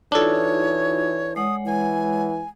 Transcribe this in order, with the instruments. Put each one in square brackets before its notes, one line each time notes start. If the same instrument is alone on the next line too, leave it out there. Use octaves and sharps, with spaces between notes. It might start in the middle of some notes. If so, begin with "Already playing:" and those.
[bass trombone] E3 [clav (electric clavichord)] D4 A4 [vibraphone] D#4 F4 F#4 [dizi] C#5
[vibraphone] G#3 C#5 F#5 [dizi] D#6
[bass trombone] E3 [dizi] G#5